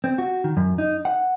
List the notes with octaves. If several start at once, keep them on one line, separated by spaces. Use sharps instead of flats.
C4
F#4
D#3
F#2
D#4
F#5